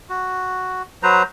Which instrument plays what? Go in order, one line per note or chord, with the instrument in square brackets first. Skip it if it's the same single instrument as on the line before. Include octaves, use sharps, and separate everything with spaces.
[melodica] F#4
F#3 B4 C5 A#5